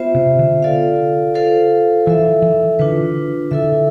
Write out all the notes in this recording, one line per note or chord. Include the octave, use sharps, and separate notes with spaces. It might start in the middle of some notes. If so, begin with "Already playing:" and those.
Already playing: B3 F4 C5 E5
C3
D3
F4 A4 D5 F5
F4 A4 C5 F5
E3 E4 A4 E5
E3
D3 D4 F4 B4
D3 E4 A4 E5